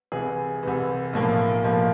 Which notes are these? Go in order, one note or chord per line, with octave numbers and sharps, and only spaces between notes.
C2 C3 E3 G#4
C2 C3 E3
B1 A2 F3 A#3
B1 A2 F3 A#3